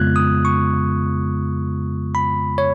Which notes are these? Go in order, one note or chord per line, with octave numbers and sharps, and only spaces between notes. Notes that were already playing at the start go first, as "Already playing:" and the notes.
Already playing: F2 C#3 G#3 B3 F4 F#6 G#6
D#6
C#6
B5
C#5